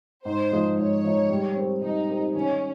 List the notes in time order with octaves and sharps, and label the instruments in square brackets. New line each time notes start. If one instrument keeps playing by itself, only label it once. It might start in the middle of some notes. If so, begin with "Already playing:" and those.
[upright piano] G#2 [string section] C5
[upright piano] F3 G#3 D#4
[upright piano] G#2 [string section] C#5
[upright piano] F3 G#3 D#4
G3
C4 G4 A#4
[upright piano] G3 [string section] D#4
[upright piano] C4 G4 A#4
[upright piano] D#3 [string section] C#4